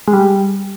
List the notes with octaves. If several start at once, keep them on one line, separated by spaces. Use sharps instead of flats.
G#3
G3